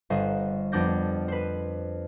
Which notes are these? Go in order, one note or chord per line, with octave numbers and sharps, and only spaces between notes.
G1 C5 D#5
F2 B3 D4 D6 G6 A#6
B4 C5